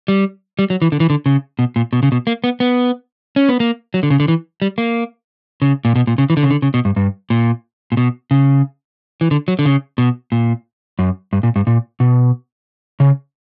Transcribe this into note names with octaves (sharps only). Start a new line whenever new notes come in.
G3
G3
F#3
E3
D3
E3
D3
C#3
B2
A#2
B2
C#3
B2
A#3
B3
B3
C#4
B3
A#3
F#3
D3
C#3
D3
E3
G3
A#3
C#3
A#2
B2
A#2
C#3
E3
D3
C#3
D3
C#3
B2
G2
G2
A#2
A#2
B2
C#3
E3
D3
F#3
D3
C#3
B2
A#2
F#2
G2
A#2
G2
A#2
B2
C#3